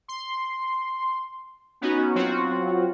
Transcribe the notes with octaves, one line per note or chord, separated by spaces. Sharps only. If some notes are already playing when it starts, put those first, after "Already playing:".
C6
B3 C#4 D#4 F#4
F#3 C4 F4 F#4